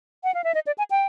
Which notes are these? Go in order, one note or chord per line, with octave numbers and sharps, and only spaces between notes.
F#5
F5
E5
D#5
D5
G#5
G5